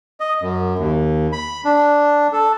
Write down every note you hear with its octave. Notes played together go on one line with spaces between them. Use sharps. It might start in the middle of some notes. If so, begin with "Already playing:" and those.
D#5
F#2
D#2
B5
D4
A4